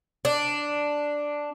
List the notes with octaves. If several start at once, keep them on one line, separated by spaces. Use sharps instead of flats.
D4